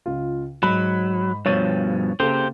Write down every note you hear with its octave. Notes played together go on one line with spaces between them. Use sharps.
C#2 F4
G#2 F#3 B5
G2 B2 F3 C#5 A6 D#7
C#3 A#3 G4 A4 C5